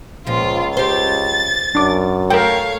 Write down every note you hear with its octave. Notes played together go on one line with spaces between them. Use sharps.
C#2 A#2 F3 F4
G4 C5 A6
F#2 D4 D6
A3 A#4 C#5 F5 G5